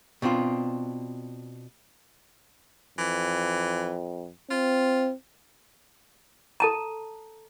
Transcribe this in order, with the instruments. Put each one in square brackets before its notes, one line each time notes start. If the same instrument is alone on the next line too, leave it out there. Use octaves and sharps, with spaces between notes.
[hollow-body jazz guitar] B2 C4 D4 F4
[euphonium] F2 [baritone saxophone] E3
[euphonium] C4 [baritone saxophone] F4
[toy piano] A4 A5 A#5